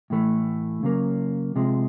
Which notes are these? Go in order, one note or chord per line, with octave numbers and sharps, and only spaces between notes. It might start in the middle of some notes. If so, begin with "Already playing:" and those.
A2 E3 A3
C#3 F#3 A#3
C3 F3 G#3